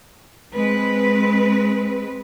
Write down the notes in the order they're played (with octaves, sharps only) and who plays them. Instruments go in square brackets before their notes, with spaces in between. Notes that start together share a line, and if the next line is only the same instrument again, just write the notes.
[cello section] G#3 C4 B4